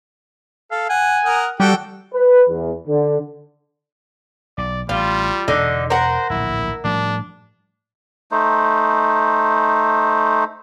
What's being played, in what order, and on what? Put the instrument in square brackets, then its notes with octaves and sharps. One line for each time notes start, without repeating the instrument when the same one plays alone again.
[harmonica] A4 [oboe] F5
[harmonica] F#5 [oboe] G#5
[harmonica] A#4 F#5 D#6
[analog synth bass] G3 [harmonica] F#4 A4 G5 [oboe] F#5
[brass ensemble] B4
E2
D3
[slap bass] B1 [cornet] D5
[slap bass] A1 [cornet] G3 [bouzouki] F4
[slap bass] E1 [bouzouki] D3 D#4
[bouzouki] A#4 F#5 [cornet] C5
[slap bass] D1 A#1 [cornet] E4
[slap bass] A2 F3 G3 [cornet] D4
[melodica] A3 D#4 C5